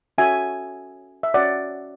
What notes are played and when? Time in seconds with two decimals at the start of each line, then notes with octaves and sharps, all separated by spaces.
0.18 C#4 F#4 A4 C#5 E5 G#5
1.23 E5
1.34 C#4 F#4 C#5 D5 F#5